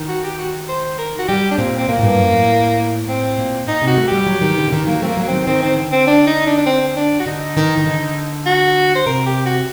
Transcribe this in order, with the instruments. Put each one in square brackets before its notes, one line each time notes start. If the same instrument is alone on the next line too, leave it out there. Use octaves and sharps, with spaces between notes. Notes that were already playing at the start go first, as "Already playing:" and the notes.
Already playing: [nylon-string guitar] D#3
[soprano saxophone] F#4
G4
F#4
C5
A#4
F#4
[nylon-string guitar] G3 [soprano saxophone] G4
[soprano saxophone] D4
[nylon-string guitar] A#2 [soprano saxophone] C4
[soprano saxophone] C4
[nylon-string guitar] A#2 [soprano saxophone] A#3
[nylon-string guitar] A2
G2
F#2
A2
[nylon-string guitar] A2 [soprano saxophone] C4
[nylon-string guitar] A#2
[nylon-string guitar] A#2 [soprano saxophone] D#4
[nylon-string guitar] C3
[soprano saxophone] F#4
[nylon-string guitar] A3
[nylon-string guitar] G3 [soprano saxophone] G4
[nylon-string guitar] F#3
D#3
D3
D3
D#3
[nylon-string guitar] F#3 [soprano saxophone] A#3
[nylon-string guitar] A3 [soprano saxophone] C4
[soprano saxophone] A#3
[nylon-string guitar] F#3 [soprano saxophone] A#3
[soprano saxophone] C4
[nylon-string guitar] D#3
[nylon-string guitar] D#3 [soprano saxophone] C4
[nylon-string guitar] D#3 [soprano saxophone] C4
[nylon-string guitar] D3
[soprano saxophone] C4
D4
D#4
D4
D4
C4
C4
D4
F#4
[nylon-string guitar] D3 [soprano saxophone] D#4
[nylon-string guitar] D#3
D#3
D3
[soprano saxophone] F#4
C5
[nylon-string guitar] C3 [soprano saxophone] A#4
[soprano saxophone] G4
F#4